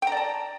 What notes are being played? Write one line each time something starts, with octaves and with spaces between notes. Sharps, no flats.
D5 G5 A5 A#5